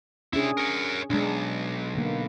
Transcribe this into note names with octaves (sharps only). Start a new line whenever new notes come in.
C3 C#4 D4 E4 G#4
A#4 C#5
B1 G#3 D4
D3 A#3